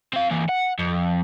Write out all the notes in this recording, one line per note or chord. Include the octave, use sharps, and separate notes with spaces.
C4 F5
E3 A#3
F#5
F2